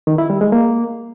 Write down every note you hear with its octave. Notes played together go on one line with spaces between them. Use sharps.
D#3
E4
G3
G#3
A#3